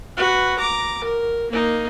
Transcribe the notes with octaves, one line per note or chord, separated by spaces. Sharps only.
F#4 B4
A#5 D6
A#4
A#3 D#4